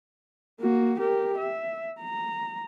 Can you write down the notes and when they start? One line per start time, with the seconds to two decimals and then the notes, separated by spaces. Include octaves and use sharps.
0.60 A#3 F#4
1.00 G4 A#4
1.38 E5
2.01 A#5